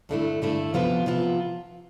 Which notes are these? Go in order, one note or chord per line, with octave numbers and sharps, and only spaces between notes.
G2 D3 A3 E4
G2 D3 A3 E4
C3 F3 B3 F4 B4
C3 F3 B3 F4 B4